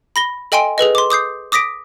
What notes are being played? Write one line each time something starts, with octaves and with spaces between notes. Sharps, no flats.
B5 A#6 G7
A4 D#5 G5 G#5 C6 D7
G#4 A4 B4 D#5
C6 D6
D6 D#6 G6 C7
D6 D#6 A#6 B6 D7